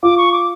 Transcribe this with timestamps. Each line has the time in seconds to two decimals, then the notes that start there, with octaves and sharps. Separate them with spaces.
0.03 F4 D6
0.18 C#6
0.32 D6